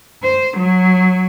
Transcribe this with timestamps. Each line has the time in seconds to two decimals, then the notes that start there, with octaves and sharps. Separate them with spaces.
0.23 C5
0.57 F#3